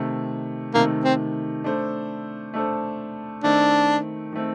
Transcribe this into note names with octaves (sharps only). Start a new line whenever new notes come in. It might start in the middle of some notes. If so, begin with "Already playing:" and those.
Already playing: C3 D#3 A3
C3 D#3 A3 A#3
C4
A3 D4 A4 C5
A3 D4 A4 C5
D#3 A3 C4 D4
D#3 A3 C4